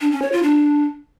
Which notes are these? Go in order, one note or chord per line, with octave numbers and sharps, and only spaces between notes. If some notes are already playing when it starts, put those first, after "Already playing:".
D4
C#4
C#5
F4
D4